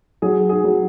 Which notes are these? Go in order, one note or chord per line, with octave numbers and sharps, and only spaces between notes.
F#3 G#4
G#4
F#3